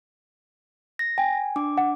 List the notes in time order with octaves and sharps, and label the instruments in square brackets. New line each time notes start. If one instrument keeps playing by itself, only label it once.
[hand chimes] A#6
[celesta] G5 [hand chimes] G#5
[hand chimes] D4 D6
[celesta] F#5